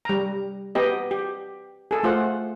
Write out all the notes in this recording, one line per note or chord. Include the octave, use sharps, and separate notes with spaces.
G3 A#5
B3 G4 D#5
G4
G#4 A4
A3 F4 C5 F#5